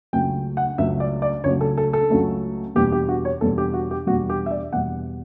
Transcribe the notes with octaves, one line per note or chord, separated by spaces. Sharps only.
C#2 C#3 F#3 A3 G5
F#5
C#2 C#3 F#3 A3 E5
D5
D5
C#2 C#3 F#3 A3 C#5
A4
A4
A4
C#2 C#3 F#3 A3
E2 B2 G3 G4
G4
F#4
C#5
E2 B2 G3 A4
G4
F#4
G4
E2 B2 G3 F#4
G4
E5
D5
E2 B2 G3 F#5